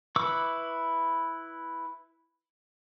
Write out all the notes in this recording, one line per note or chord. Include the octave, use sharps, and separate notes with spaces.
E4 B4 C#6 D6 E6